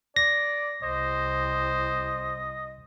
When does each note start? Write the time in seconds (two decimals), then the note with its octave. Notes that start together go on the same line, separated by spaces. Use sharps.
0.16 D5 A#6
0.83 C2 C5 D#5